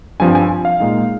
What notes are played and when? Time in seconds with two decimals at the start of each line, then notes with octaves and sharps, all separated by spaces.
0.20 G2 F3 C4 G#5
0.35 G#5
0.65 F5
0.80 A#2 G#3 D#4